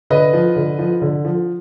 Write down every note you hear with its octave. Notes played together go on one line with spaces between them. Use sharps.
D3 B4 D#5
F3
D3
F3
D3
F3